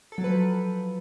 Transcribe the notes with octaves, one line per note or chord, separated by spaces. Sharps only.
A4
F#3
B4
F3